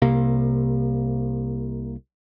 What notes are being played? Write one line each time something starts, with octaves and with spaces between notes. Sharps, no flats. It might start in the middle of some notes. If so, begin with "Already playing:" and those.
C2 C3 A#3